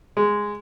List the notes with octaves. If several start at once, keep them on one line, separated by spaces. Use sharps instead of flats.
G#3